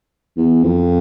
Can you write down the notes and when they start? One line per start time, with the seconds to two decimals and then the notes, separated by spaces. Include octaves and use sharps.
0.37 E2
0.64 F2